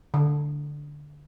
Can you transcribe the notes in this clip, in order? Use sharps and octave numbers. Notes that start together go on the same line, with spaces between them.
D3